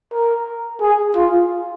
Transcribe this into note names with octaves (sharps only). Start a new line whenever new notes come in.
A#4
G#4
F4